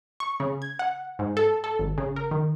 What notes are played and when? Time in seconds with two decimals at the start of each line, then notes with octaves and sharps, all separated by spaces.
0.20 C#6
0.40 C#3
0.62 G#6
0.79 F#5
1.19 G#2
1.37 A4
1.64 A4
1.79 G#1
1.98 C#3
2.16 A#4
2.31 D#3